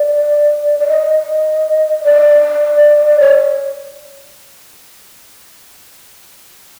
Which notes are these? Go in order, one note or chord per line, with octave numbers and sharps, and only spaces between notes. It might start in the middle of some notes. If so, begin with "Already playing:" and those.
Already playing: D5
D5
D#5
D5
C#5